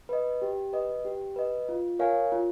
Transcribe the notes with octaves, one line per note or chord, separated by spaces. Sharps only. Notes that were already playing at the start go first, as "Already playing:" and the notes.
B4 D#5
G4
B4 D#5
G4
B4 D#5
F4
A#4 C#5 F5 G#5
F4